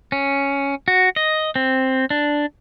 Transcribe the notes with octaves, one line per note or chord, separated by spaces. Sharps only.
C#4
F#4
D#5
C4
D4